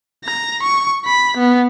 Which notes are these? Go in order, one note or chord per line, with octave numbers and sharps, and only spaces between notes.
A#5
C#6
B5
B3